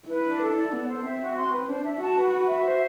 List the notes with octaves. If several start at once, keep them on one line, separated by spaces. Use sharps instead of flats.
E4 B4
D4
A4
D5
B3 A4
C5
C4 E5
F#4
C6
B4
D4 C5
E5
F#4 A5
B4
B4
E5
C5